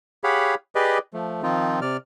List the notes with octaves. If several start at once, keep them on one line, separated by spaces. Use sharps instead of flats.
G4 G#4 C#5 F5 F#5 B5
G4 G#4 B4 D5 D#5
F3 A3
D#3 F3 C4 D#4 F4
C3 D5 F6